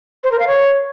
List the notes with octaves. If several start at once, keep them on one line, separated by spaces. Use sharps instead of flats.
C5
A#4
F5
C#5